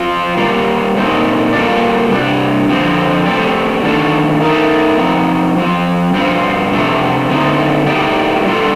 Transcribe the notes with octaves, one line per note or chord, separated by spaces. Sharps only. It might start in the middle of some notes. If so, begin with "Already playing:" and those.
Already playing: F3 C4 F4
G3 A#3 F4
A#2 A3 C4 D#4
G3 A#3 F4 A4 D5
C3 G3 D4
F2 D3 F3 C4
A3 C4 G4 D5
D#3 A3 D4 F4 A4
A3 D#4 A#4
F3 C4 D#4
F3 C4 F4
G2 F3 C4 F4
C3 F3 A3 D4
D3 A3 C4 D#4
A2 A3 D#4 G4 D5
A2 G3 D4 F4 A4